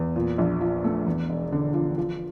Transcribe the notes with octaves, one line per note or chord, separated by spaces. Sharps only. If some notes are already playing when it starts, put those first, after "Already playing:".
Already playing: E2
A#2
A#1
F3
A3
E2
E1
D3
F3
F3